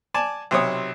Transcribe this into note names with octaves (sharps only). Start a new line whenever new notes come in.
D5 G#5 A5
B1 C3 C#5 D#6